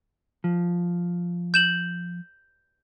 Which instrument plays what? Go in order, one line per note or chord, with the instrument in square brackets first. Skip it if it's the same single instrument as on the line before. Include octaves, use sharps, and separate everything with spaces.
[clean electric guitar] F3
[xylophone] G6 E7 F#7